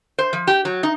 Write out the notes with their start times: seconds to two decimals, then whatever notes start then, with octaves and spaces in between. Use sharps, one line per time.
0.18 C5
0.33 F3
0.47 G4
0.65 F#3
0.83 D#4